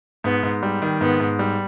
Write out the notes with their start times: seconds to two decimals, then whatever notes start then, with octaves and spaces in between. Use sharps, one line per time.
0.24 G#2 B3
0.43 G#2
0.63 G3
0.82 D#3
1.01 G#2 B3
1.20 G#2
1.39 G3